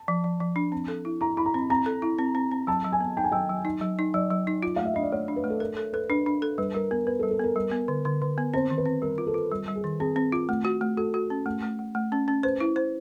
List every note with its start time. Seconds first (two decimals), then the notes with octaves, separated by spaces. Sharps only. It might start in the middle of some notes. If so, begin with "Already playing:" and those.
Already playing: A5
0.08 F3
0.24 F3
0.40 F3
0.56 D4
0.72 C4
0.88 A4
1.05 E4
1.21 E4 A#5
1.37 E4 B5
1.46 A#5
1.54 C4
1.70 C4 A#5
1.86 A4
2.02 E4
2.18 C4
2.35 C4
2.51 C4
2.67 F#3 A5
2.84 F#3
2.92 G#5
3.00 B3
3.17 D#4 G5
3.24 G#5
3.32 F#3 G5
3.49 F#3
3.65 D#4
3.81 F#3
3.99 D#4
4.14 F#3 D5
4.31 F#3
4.47 D#4
4.63 F4
4.76 A3 F5
4.85 E5
4.94 D4 D#5
5.03 D5
5.12 A3 C#5
5.28 D4
5.36 B4
5.44 A3
5.50 A4
5.60 A4 A#4
5.77 A4
5.93 A4 B4
6.10 D4 B4
6.26 D4
6.42 A4
6.58 G3 B4
6.74 G3 A#4
6.91 B3 A#4
7.06 B3 B4
7.19 A4
7.23 G3
7.31 A4
7.40 B3 A#4
7.56 G3
7.72 B3
7.88 D3
8.05 D3
8.22 D3
8.38 B3
8.54 C4 C5
8.70 D#3
8.78 B4
8.86 C4
9.02 G3 A#4
9.18 F4
9.27 A4
9.34 F4
9.51 G3
9.68 G3
9.75 G#4
9.84 D#3
10.00 C4 G#4
10.16 C4
10.32 F4
10.49 A3
10.65 F#4
10.81 A3
10.97 F#4 A4
11.14 F#4
11.30 C#4
11.46 A3
11.63 A3
11.79 A3
11.95 A3
12.12 C#4
12.28 C#4
12.43 B4 C5
12.60 E4
12.76 C5